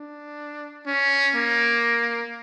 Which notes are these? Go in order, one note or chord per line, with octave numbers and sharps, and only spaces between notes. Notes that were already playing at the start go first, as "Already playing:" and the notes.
Already playing: D4
C#4
A#3